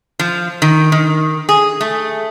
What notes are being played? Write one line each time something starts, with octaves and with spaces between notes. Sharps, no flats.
F3
D#3
D#3
G#4
A3